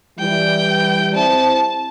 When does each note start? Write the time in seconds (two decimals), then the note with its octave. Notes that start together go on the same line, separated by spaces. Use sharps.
0.19 E3 G3 G5
1.15 C4 E4 A5